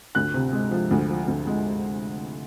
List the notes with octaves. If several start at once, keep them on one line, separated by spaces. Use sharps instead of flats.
D2 F#6
C3
G#3
F3
D2
F3
D2
G#3